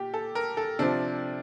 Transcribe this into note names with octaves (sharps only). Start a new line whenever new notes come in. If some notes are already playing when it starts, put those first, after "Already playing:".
Already playing: A#2 G4
A4
A#4
A4
C3 F3 D4